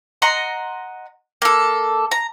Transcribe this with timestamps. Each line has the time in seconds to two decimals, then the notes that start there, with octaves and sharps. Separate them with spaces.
0.22 D#5 F#5 A#5 C6
1.42 A#3 A4
2.11 A#5